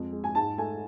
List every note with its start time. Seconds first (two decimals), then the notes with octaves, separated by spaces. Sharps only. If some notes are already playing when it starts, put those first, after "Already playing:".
Already playing: F2 G#3
0.12 G#3
0.24 G#5
0.35 G#2 A5
0.58 A3 G#5